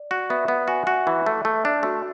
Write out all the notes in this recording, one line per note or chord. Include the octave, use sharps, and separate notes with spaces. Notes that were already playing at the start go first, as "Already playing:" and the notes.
Already playing: D5
F#4
B3 E5
B3 F#5
F#4 G#5
F#4 F#5
E3 E5
A3
A3
D4
A3 F#4